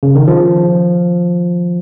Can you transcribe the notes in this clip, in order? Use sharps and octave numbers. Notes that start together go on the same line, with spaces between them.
C#3
D#3
F3